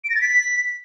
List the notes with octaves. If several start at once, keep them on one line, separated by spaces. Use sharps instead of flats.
D7
A#6
A6
B6